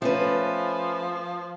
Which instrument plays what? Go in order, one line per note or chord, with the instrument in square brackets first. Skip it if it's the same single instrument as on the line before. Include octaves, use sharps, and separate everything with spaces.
[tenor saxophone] F3 [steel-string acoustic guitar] A3 C#4 B4